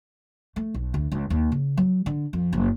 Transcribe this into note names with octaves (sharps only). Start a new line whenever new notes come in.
A3
B1
D2
C#2
D#2
C#3
F#3
D3
F2
F#1